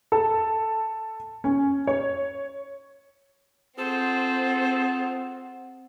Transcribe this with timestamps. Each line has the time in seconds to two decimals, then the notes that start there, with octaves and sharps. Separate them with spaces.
0.12 A4
1.44 C#4
1.87 C#5
3.78 C4 F4 G#4 A4 C5 F#5